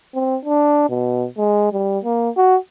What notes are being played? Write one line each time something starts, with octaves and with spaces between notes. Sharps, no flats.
C4
D4
B2
G#3
G3
A#3
F#4